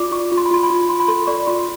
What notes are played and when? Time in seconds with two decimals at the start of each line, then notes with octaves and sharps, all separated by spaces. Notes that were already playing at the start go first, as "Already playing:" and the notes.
Already playing: F4 D5 D6
0.11 F4 C#6
0.32 F4
0.37 C6
0.46 B5
0.51 F4 C6
0.63 B5
0.70 F4
0.89 F4 C6
1.00 B5
1.08 A4 C6
1.27 D5 C#6
1.47 F4 C6